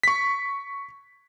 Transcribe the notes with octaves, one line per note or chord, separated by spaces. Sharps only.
C#6 B6